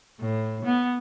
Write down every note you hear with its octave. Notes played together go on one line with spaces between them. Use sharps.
A2
B3